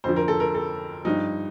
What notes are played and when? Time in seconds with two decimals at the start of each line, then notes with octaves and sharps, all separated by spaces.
0.04 F2 D3 F3 C5
0.16 A#4
0.28 A4
0.40 A#4
0.55 A4
1.05 G2 F3 D#4